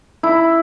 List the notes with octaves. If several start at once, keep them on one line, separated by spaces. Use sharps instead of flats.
E4